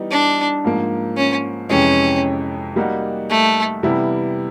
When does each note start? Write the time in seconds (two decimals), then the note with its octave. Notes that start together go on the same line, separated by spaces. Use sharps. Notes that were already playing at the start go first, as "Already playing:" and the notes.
Already playing: E3 G3 B3 D#4
0.11 D4
0.65 G#2 F3 A#3
1.17 C#4
1.70 F2 C3 E3 G#3 C#4
2.76 G3 A#3 D#4 F#4
3.30 A3
3.83 C3 E3 G3 B3 E4